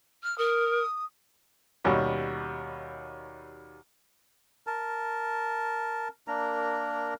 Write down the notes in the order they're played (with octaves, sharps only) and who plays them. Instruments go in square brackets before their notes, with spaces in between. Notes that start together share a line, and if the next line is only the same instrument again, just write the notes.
[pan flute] F6
[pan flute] A#4 [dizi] D#6
[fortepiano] D#2 B2 G3 C#4
[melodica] A#4 A5
A#3 D4 A#4 A#5